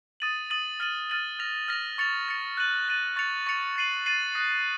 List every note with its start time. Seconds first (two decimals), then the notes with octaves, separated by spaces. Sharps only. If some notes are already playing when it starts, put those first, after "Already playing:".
0.20 D#6 A6 D#7 F#7
0.50 D#6 A6 D#7 F#7
0.80 F6 A6 D#7 F#7
1.10 F6 A6 D#7 F#7
1.39 F6 A#6 F7
1.68 F6 A#6 F7
1.98 C#6 A6 C#7 F7
2.28 C#6 A6 C#7 F7
2.57 F#6 A6 D#7 F#7
2.88 F#6 A6 D#7 F#7
3.16 C#6 A6 C#7 F7
3.46 C#6 A6 C#7 F7
3.76 A6 C7 D#7 F#7
4.06 A6 C7 D#7 F#7
4.35 D#6 F#6 A#6